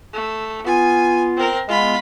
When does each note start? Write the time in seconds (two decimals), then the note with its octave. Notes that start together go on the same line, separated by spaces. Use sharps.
0.13 A3
0.66 B3 F4 G#5
1.37 C4 A#4
1.68 G#3 B3 F4 B5